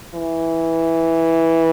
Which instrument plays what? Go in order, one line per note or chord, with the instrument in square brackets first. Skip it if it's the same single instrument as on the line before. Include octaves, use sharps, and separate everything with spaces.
[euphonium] E3